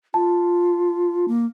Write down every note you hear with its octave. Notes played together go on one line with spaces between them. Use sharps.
F4 A5
A#3